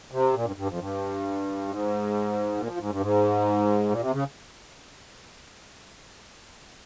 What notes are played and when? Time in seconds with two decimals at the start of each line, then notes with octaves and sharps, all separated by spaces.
0.12 C3
0.34 A#2
0.45 G2
0.56 G2
0.68 F2
0.79 G2
1.68 G#2
2.57 A#2
2.67 F3
2.79 G#2
2.90 G2
3.00 G#2
3.90 A#2
4.00 C3
4.12 C#3